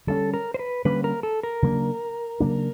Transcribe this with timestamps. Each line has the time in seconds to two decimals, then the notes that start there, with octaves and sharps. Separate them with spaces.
0.07 D3 G3 A#3 C#4 A4
0.34 A#4
0.54 C5
0.59 B4
0.85 D3 G3 A#3 C#4 B4
1.04 A#4
1.23 A4
1.43 A#4
1.62 C#3 F#3 A#3 D4
2.40 C#3 F#3 A#3 D4